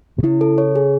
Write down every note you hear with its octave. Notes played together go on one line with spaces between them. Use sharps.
B2
C#3 E4
A4
C#5
G#4